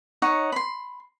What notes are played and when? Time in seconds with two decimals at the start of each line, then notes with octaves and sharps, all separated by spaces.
0.22 D#4 C#5 F#5
0.52 B5 C6